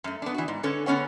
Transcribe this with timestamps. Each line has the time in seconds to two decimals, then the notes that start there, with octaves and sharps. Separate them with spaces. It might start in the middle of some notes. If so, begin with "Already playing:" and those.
0.04 F#2 A3
0.22 B3 D4
0.34 E3 F#4
0.48 G#2
0.63 D3 C#4 A4 B4 C#5
0.86 D3 B3 C#4 C#5 F#5